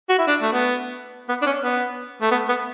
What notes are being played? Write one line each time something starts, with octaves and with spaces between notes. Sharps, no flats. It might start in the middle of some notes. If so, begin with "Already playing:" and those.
F#4
E4
D4
A3
B3
B3
D4
C#4
B3
A3
B3
B3